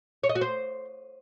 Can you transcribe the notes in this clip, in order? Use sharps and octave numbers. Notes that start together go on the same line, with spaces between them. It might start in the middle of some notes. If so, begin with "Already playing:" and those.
C#5
D#5
F#4
C5